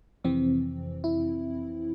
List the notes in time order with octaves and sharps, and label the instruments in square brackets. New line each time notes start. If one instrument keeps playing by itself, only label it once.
[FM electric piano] F2 C3 E3 C4
E4